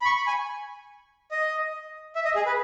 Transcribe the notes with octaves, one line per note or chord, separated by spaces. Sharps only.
B5
C#6
B5
G#5
D#5
E5
D#5
G#4
B4